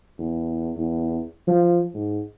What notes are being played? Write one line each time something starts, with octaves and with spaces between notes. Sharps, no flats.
E2
E2
F3
G#2